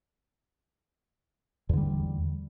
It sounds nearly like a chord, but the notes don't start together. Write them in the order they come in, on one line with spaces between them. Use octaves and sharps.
E2 D3 G3